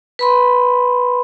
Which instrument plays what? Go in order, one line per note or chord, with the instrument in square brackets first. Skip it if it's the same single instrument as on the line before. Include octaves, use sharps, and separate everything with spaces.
[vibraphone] B4 B5 C6